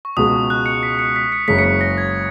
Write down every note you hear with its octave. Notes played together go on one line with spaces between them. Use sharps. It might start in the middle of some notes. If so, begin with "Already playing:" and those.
C#6
C#2 B2 G#3 D#6
F#6
C#7
B6
C#7
B6
C#7
F#1 F#2 C#3 G#3 B6
C#7
B6
A#6
G#6